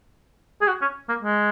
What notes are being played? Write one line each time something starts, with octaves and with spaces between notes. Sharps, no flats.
G#4
F#4
C#4
A#3
G#3